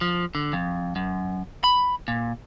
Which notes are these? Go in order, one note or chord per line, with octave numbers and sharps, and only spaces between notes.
F3
D3
F2
F#2
B5
A#2